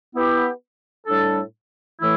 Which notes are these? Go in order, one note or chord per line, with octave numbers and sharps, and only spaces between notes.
B3 E4 G4
A2 G3 D4 A4
A2 E3 A3 E4